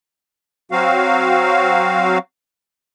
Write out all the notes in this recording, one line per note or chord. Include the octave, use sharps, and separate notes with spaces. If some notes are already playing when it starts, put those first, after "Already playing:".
F#3 C4 F#4 F5